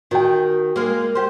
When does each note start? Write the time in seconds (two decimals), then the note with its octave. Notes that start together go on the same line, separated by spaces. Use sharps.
0.11 D#3 F#4 G5
0.76 G#3 A#3
1.15 G4 C5